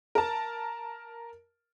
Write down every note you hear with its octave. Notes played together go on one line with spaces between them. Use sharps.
A#4 A5